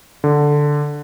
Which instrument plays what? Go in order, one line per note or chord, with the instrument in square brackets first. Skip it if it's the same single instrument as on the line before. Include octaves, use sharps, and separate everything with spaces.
[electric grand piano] D3